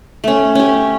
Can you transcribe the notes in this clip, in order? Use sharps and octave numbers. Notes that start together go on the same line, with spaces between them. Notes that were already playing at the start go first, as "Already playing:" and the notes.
A3 C#4
C#4 G4